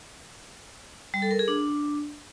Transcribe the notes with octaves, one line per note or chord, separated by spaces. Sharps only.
G3
A4
A#4
G#4
D4